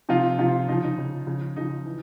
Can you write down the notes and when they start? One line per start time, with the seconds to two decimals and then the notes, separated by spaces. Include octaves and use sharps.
0.09 C3 F3 D#4 F4
0.38 C3 F3 D#4 F4
0.68 C#3 F3 D#4
0.83 D#4
0.98 C#3 F3
1.27 C#3 F3
1.56 C#3 F3 D#4
1.85 E3